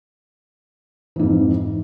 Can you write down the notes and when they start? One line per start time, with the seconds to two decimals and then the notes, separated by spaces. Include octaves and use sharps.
1.16 E3
1.19 G#2
1.23 F2